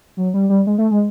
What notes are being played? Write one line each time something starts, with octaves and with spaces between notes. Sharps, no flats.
F#3
G3
G3
G#3
A3
G#3